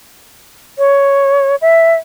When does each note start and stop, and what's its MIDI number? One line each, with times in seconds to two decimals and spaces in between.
0.78 1.55 73
1.61 1.94 76